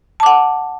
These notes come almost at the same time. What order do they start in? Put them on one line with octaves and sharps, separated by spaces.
A5 D6 F#5